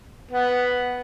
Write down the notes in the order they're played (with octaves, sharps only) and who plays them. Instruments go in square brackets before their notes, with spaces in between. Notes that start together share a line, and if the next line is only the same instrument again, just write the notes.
[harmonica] B3